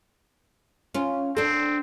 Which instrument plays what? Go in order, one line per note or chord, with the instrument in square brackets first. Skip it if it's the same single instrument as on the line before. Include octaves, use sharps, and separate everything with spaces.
[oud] C#4 F4
[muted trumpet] C4 [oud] D4 A4